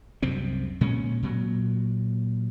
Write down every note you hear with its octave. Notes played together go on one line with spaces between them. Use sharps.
C2 F#2 C3 C4
A#2 G#3 C#4
A#2 F#3